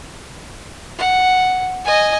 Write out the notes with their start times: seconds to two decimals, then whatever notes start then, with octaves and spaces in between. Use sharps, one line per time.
0.98 F#5
1.85 D#5 G#5